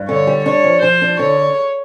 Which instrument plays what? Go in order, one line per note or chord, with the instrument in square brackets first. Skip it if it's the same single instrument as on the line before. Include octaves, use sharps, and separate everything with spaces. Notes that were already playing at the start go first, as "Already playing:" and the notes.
Already playing: [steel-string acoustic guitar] G2
[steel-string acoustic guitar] D3 [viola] C#5
[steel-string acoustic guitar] G3
[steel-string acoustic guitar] D4 [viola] C#5
[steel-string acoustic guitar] F3
[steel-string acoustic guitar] F3 [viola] C5
[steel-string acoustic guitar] D4
[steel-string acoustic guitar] D3 [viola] C#5